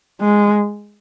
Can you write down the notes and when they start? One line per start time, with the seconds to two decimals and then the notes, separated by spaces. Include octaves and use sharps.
0.21 G#3